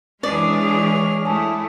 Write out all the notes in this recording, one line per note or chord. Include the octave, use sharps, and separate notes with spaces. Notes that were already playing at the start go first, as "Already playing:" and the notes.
E3 G#3 D4 G#4 C#5 D5 F6
A3 E4 G#5 A5 D#6